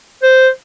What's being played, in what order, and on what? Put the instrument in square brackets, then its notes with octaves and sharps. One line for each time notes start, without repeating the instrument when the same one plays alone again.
[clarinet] C5